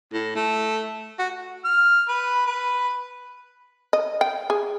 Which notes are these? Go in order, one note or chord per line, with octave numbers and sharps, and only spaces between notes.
A2
A3
F#4
F6
B4
B4
D#5
G5
G#4